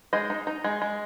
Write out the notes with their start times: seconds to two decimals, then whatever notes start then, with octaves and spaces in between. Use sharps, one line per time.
0.13 G#3 C5 D#5
0.30 D#4
0.47 D#4
0.64 G#3
0.82 G#3